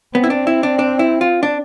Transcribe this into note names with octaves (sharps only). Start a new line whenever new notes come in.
B3 C4
E4
D4
E4
D4
D4
E4
F4
D4